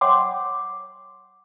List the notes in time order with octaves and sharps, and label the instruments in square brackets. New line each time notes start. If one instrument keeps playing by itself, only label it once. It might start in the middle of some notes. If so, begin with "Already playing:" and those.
[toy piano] C#5 F#5 G5 C6 D6